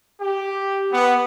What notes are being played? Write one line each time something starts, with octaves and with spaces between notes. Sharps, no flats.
G4
B3